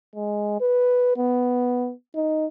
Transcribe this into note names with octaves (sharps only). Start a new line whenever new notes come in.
G#3
B4
B3
D#4